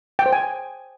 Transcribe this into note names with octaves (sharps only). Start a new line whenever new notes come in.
G5
C5
G#5